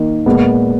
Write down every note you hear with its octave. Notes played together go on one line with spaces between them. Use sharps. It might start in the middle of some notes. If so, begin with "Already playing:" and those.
Already playing: D#3 A#3
A#2 G#3 B3